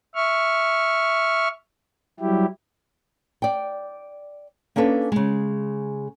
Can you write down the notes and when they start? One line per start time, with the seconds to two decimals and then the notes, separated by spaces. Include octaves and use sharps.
0.15 E5 C#6 F6
2.20 F#3 G3 E4 G4
3.42 D5 G5
4.76 A#3 C#4 D4 A4 B4
5.12 C#3 G#3